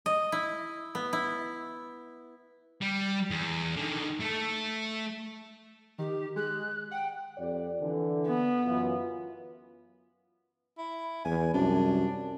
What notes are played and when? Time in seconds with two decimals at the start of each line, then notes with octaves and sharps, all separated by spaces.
0.06 D#5
0.32 E4
0.95 B3
1.13 E4
2.82 G3
3.30 E2
3.77 D3 D#3
4.20 A3 A4
5.98 D#3 G4
6.36 G#3 F#6
6.91 F#5 G5
7.38 F2 G4 D5
7.81 D3 E3
8.27 B3
8.65 F#2 E3 F4
10.78 E4
11.25 E2 G#5
11.54 C2 F#2 D4